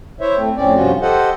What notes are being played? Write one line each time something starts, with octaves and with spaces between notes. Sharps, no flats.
E4 C5 C#5 E5
A3 C4
F2 A2 C4 C#4 D5
G2 C3 F3 C#4 F4 F#4
G4 A4 C5 D#5 F#5